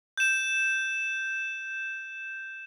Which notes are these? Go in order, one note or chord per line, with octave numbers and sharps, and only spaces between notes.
G6 E7